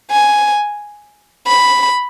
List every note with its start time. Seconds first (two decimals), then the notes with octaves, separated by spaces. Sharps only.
0.11 G#5
1.47 B5